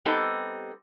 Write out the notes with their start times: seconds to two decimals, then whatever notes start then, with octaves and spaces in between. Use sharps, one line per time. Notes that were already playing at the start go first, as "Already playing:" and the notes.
0.05 G3 B3 C4 D#4 G4 A4